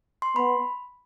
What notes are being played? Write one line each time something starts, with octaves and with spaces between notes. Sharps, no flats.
C6
B3 B5